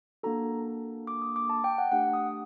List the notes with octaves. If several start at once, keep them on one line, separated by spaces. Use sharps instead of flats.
A#3 D4 F#4 A4 A#5
D6
D#6
D6
A5
G5
F#5
A3 D4 G4 F#5
D#6